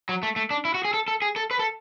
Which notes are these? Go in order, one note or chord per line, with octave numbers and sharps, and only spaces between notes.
F#3
A3
A3
D4
E4
F#4
G#4
A4
A4
G#4
A4
B4
A4